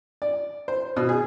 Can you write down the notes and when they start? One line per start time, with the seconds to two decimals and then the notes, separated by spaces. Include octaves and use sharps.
0.22 D5
0.68 C5
0.97 B2
1.09 G#4